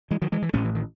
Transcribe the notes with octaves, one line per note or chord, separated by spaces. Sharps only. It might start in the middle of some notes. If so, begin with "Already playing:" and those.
E3 G#3
D#3 F#3
E3 G#3
E3
A1 A2 A3 C#4
E3
D#3